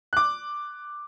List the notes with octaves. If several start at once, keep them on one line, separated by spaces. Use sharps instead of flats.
D6 F#6